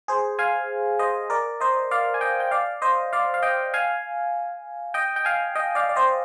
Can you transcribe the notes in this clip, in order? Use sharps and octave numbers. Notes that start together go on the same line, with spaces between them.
G#4 C5
F5 G#5
C5 D#5
A#4 D5
C5 D#5
D5 F5
G#5
D#5 G5
G5
D5 F5
C5 D#5
D5 F5
F5
D#5 G5
F5 G#5
D#5 G5
G5
F5 G#5
D#5 G5
D5 F5
D5
C5 D#5